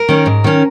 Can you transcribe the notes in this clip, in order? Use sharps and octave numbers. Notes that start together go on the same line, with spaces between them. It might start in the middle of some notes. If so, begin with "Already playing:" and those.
Already playing: A#4
D#3 C#4
G#2
D#3 C#4